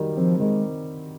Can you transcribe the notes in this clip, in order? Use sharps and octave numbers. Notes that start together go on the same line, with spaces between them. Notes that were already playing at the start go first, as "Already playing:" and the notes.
Already playing: D#3 F#3 G3
F3 C4
D#3 G#3